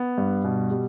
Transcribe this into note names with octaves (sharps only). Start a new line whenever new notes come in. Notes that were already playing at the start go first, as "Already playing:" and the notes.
Already playing: B3
G2
B2
G3